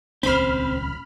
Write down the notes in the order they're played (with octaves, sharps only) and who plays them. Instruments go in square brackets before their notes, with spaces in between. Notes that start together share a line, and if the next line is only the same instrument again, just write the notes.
[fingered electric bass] D#1 C#2 C#4 [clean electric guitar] C4 C5 [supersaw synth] B5 F6